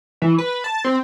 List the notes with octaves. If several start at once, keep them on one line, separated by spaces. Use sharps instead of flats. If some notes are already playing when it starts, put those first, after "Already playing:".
E3
B4
A5
C4